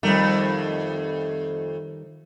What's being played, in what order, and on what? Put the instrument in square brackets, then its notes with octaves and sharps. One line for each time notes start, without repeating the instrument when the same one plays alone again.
[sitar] F2 A3 [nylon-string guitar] D#3 G3